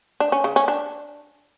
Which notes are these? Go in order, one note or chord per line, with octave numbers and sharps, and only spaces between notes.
D4
C#4
C#3
C#4
D4